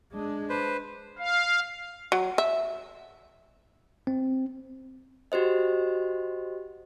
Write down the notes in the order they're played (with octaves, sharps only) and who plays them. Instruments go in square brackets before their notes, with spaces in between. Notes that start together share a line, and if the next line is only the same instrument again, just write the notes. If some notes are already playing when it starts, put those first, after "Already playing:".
[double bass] G#3 D4
[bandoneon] B4 C5
[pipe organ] F5
[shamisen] F#3
E5
[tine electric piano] C4
[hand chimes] F#4 G4 C5 D#5